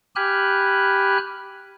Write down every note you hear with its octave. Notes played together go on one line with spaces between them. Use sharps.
G4 G#5 B5 F6 F#6